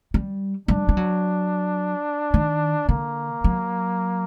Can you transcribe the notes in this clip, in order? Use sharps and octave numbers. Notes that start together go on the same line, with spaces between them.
G3
G3 D4
G3
F#3
D#3
D3 A#3
F#3